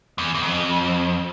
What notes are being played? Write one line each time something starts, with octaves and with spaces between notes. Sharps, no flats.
E2
E2
F2